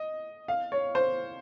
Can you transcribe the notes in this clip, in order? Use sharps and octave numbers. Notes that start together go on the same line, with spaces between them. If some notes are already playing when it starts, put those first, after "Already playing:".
Already playing: D#5
F5
C#5
C5